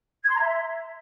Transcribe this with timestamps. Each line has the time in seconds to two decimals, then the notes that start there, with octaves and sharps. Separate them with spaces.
0.23 G#6
0.29 C6
0.35 A#5
0.40 E5